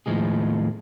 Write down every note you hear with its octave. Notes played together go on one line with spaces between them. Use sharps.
D#2 A2 D#3 F3 G#3 G#4